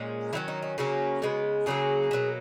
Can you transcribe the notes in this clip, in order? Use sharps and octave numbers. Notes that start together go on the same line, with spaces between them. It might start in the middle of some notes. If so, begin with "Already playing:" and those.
Already playing: A#2 G#3 C#4
D#3 F#3 C#4 E4
D#4
D#4
C#3 F#3 A#3 C#4 F#4
C#3 G#3 B3
C#3 F#3 A#3 G#4
B2 F#3 A#3